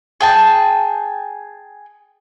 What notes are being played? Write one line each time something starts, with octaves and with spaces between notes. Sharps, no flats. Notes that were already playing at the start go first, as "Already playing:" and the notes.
G#4 G5 A5